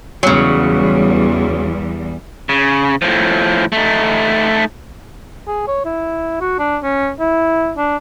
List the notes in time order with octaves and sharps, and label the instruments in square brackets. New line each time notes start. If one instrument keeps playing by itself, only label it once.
[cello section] E2 G3 [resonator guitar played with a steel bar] C#3 F#3
[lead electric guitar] C#3
A2 F3
A3 D#4
[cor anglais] G#4
C#5
E4
F#4
D4
C#4
E4
D4